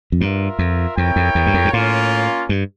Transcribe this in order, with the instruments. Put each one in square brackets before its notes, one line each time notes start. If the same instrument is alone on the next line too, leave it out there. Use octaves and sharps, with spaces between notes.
[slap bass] F2
[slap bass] G2 [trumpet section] F4 A#4 E5
[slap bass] F2
[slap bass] F2 [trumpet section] E4 A#4 C#5 G5
[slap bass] F2
E2
G2
F2
G2
[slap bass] A2 [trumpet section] A#3 C#4 F4
[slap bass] G2